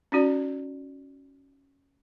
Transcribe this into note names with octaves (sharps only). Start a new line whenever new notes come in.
C#4 D#4 F#4 D5